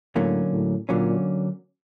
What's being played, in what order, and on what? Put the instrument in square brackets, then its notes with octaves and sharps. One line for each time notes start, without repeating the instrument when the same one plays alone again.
[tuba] A2 [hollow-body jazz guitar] D3 F#3 A#3 C#4
[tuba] A2
[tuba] A#2 [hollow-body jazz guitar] D3 F#3 A#3 C#4